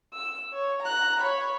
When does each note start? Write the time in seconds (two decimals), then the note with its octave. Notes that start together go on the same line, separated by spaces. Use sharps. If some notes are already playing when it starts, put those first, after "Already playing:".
0.13 E6
0.53 C#5
0.83 A#5 F#6
1.21 C#5 B5